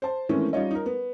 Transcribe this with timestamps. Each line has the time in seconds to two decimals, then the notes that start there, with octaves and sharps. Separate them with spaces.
0.02 C5 A5
0.29 D#3 E3 G#3 A3 C4 C#4
0.53 G3 C#4 D#4 F4 C#5 D#5
0.71 D#4 A#4
0.86 B3